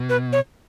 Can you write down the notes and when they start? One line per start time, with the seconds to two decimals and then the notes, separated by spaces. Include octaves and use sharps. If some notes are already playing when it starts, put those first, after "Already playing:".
Already playing: B2
0.09 B4
0.33 C#5